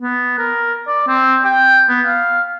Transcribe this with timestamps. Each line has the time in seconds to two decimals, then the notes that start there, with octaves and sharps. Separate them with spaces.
0.01 B3
0.38 A#4
0.88 D5
1.08 C4
1.44 G5
1.89 B3
2.07 F5